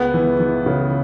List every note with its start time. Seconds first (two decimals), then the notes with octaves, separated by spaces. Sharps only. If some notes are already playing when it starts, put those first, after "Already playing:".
Already playing: C#2 B3
0.14 E3
0.40 E3
0.66 C#3